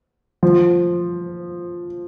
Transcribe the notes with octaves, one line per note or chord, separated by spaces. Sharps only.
F3